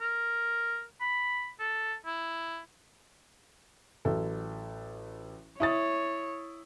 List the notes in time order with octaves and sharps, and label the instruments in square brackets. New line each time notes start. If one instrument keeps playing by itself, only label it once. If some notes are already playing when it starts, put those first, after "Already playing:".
[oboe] A#4
B5
A4
E4
[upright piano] A1 F#3 A4
[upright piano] E4 D#6 A6 [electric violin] C#5